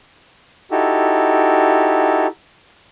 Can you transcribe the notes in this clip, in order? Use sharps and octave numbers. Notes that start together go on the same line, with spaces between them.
D#4 E4 F#4 G4 A4